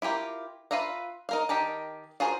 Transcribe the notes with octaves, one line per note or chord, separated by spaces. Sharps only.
E4 F4 G4 A#4
F4 B4 E5 F5 A#5
D#4 A#4 F5
D#3 D#4 G4 A#4 A5
F4 F#4 G#4 A#4 C5